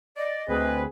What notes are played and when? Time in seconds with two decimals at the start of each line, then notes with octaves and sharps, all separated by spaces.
0.17 D5 D#5
0.49 D2 C4 G#4 B4